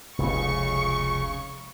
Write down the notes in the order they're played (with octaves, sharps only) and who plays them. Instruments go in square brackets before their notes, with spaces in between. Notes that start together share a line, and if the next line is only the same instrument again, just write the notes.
[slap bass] F1 C#2 [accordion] C#3 [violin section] C#6